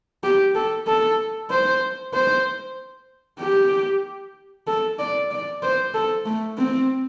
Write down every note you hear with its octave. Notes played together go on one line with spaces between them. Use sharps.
G4
A4
A4
C5
C5
G4
A4
D5
D5
C5
A4
A3
C4